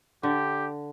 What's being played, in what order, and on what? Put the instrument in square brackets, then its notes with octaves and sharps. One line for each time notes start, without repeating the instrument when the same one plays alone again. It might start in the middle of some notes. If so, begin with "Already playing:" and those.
[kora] D3 [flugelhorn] G4